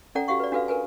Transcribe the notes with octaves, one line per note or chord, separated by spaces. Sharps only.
C#4 A4 D5 F#5 A#5
F#4 G4 F5 F#5 C#6
B4 D5
D4 F#4 A4 B4 F5
A#4 B4 G#5